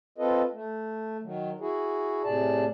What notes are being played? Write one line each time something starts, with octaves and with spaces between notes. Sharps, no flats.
C4 F4 A4 B4 D#5
A3
D#3 F#3
E4 F#4 G#4
A2 C3 G#4 D5 A5